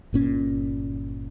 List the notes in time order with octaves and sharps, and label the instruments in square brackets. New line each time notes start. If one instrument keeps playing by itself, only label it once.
[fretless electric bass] G1 A#2 C#4